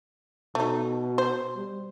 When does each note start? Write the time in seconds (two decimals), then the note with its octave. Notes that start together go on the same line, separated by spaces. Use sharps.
0.55 B2 A3 D#4
1.18 C5
1.56 G3